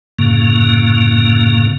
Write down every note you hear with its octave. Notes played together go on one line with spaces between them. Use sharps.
F#2 A2 C#3 A#3